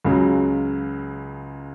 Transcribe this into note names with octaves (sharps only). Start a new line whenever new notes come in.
C#2 C#3 F#3